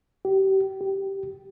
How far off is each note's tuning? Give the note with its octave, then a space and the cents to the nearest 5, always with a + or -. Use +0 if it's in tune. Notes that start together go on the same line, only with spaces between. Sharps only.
G4 -30
G4 -10